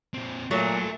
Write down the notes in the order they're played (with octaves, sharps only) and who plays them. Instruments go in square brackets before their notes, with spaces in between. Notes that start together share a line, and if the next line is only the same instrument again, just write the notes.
[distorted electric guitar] A#2 C4
[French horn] A#2 [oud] F#3 [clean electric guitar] A3 [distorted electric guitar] G#4 E5